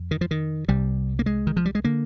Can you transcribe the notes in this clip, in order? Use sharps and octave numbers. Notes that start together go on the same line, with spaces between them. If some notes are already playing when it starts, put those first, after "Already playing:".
Already playing: F2
D#3
F3
D#3
C2 C3 G3
A#3
G#3
D#3
F3
G3
G#3
D3 A#3